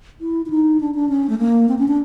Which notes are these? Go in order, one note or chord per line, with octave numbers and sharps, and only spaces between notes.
E4
E4
D#4
D4
D4
C#4
A3
A#3
C4
C#4
D4